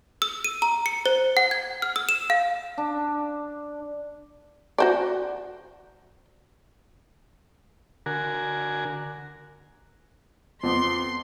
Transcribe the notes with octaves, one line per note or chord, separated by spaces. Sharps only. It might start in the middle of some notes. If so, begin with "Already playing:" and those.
E6
D#7
A#5
C#7
C5
F#5
G#6
F6
E6
E7
F5
D4
F#4 C5 D5
D3 F#4 A#4 G#5
F2 B3 C6 D6